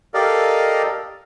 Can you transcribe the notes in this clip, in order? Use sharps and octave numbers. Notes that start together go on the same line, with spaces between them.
G4 A4 A#4 D5 D#5 F5